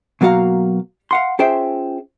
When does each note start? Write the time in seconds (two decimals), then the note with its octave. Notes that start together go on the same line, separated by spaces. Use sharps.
0.21 B2 F#3 A#3 F#4 F5 A#5
1.11 F5 F#5 C6
1.39 C#4 F4 G#4 C5 E5 G5